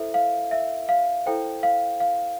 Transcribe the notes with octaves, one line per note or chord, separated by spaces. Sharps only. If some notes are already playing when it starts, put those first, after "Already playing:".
Already playing: E4 A4 C5 E5
F5
E5
F5
E4 A4 C5 G5
F5
F5